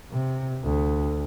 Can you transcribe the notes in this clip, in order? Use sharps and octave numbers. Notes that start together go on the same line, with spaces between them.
C3
D2